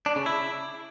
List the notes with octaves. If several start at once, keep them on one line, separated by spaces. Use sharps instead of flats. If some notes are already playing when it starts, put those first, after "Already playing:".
D4
C#3
E4